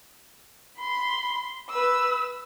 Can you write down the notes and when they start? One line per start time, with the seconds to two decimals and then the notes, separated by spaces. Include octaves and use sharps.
0.77 B5 C6
1.70 B4 E6